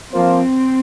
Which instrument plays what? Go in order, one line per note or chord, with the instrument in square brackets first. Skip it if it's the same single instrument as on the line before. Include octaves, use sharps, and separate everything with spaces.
[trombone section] F3 A#3 F4 C5 [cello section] C4